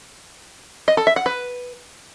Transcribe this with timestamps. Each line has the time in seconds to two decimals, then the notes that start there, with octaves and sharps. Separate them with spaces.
0.88 D#5
0.97 A4
1.07 E5
1.16 F#5
1.26 B4